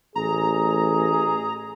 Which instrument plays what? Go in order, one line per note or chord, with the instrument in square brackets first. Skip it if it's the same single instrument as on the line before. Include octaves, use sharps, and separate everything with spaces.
[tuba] A1 [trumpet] G#4 [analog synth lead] A#5